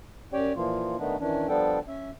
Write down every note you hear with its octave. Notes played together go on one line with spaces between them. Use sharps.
F#2 C#4 G4 C#5 D5 G5
A#2 E3 F3 A#3 F4
D#3 A3 B3 D4 D#4
D#3 E3 C#4 D4
F3 G3 B3 D4 A4 G5
C#4 E5